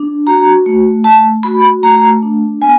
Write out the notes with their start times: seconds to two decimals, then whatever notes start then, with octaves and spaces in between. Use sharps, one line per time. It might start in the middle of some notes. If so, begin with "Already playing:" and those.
Already playing: D4
0.27 F#4 A#5
0.66 A3
1.04 A3 A5
1.43 F#4 B5
1.83 A3 A#5
2.23 D4
2.62 B3 G#5